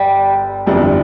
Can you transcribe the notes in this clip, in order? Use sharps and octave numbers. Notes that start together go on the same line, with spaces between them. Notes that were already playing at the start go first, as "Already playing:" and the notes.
Already playing: G1 G3
G1 F2 E3 G3 D4